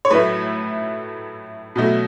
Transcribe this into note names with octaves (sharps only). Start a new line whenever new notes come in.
C#5
A2 F#3 A3 E4 B4
B2 F#3 A3 E4